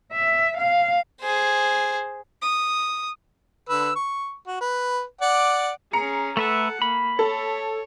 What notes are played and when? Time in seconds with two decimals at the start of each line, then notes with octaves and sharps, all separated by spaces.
0.13 E5
0.58 F5
1.22 G#4 C5
2.42 D#6
3.69 D3 B4 E6
3.96 C#6
4.47 F#4
4.61 B4
5.21 D5 F#5 D6
5.93 C#4 G#4 A#5 C#7
6.37 A3 A4 B4 E5 F#5
6.82 A#3 B5
7.19 A4 C#5